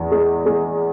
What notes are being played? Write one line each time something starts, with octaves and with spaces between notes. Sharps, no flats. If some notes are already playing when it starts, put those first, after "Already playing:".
Already playing: E2
G#3
G#3